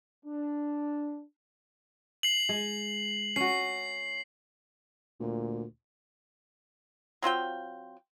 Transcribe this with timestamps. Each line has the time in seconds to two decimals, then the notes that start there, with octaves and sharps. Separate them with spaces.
0.25 D4
2.23 C7 F#7
2.49 G#3
3.36 C#4 F#4 C7
5.20 D2 A#2
7.22 F#3 C4 F4 G5